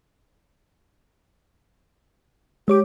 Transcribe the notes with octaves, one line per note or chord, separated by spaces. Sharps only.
G#3 G4 C#5 D6